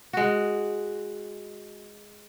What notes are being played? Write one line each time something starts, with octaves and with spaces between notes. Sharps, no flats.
G#3 F#4